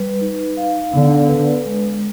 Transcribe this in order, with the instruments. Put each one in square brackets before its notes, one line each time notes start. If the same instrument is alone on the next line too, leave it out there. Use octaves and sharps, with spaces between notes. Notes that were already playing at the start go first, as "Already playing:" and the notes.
Already playing: [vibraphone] G3 B4
D#4
F5
[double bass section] D3 [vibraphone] B3
[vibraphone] B4
G#3